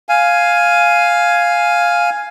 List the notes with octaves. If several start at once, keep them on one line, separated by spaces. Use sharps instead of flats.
F5 G#5